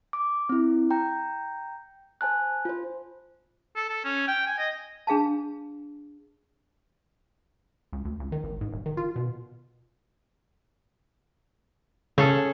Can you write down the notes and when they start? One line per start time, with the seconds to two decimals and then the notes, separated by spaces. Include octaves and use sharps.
0.13 D6
0.49 C4 E4
0.90 G5 A#5 G6
2.21 C5 G#5 A5 F#6
2.65 F4 C5
3.76 A4
3.90 A4
4.04 C#4
4.28 G5
4.47 G#5
4.59 D#5
5.07 D4 G#4 F5 A5
7.93 C#2
8.05 D2
8.20 C#2
8.32 D#3
8.44 G#1
8.61 G#2
8.72 D#1
8.86 D#3
8.97 F4
9.16 B2
12.18 C#3 C#4 G#4 A4